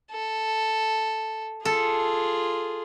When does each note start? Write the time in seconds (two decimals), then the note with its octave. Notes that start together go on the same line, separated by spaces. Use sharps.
0.12 A4
1.65 F4 G#4 A4